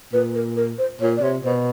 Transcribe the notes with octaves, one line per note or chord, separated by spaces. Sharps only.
A#2 B4
A#4
A#4
C5
A#2 C#5
D5
C3 C#5
B2 C5